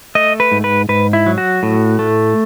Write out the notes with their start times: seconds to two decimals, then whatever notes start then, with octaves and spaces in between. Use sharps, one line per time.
0.15 A3 D#5
0.40 B4
0.52 G#2
0.64 B4
0.89 G#2 B4
1.13 E4
1.26 F#3
1.38 F#4
1.63 A2
1.99 A3